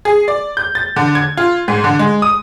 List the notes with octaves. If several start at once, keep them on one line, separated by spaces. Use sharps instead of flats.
G#4
D5
G6
A6
D3
G#6
F4
G#2
D3
G#3
D#6